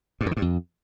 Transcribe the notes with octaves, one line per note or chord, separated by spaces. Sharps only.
G2
F2
D#3
G2
F2